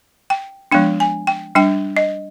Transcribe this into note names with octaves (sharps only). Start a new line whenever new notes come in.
G5
F3 G#3 B3 D4 G5
G#5
G5
G3 D4 G5
D#5